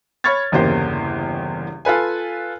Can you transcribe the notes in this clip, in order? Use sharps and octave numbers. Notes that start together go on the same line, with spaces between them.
C#5 B5 C#6 F6 G#6 A6
G1 E2 C#3 A#3 G4 C5
F4 A4 B4 G#5